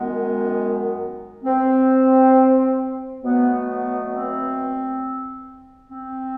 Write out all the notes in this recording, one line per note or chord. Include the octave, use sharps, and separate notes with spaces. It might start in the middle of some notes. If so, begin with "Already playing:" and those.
Already playing: F#2 D#3 G#3 B3
C4
B2 F#3 A3 B3
B3
C4
C4